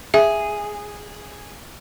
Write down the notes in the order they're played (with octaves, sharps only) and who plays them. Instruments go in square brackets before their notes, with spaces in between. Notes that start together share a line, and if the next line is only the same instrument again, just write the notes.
[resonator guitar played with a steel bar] G#4 [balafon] E5